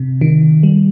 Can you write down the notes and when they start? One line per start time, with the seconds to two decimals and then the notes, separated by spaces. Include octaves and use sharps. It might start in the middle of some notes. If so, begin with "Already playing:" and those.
Already playing: C3
0.21 D#3
0.63 G3